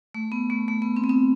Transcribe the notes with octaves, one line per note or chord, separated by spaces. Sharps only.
A3
B3
A3
A3
B3
C4
B3
C4